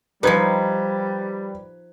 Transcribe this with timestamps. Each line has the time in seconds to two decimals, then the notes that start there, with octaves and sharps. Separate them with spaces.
0.23 F3 G3 D#4 B4 G#6